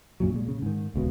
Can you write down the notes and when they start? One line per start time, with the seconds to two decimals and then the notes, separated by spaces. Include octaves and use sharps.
0.20 F#2 A#2 F#3
0.34 A#2 G#3
0.48 C#3
0.62 G#2 D#3
0.94 D#1 C#2 B2